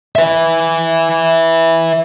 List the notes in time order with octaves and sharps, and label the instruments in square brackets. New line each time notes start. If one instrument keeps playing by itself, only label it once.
[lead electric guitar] B4 E5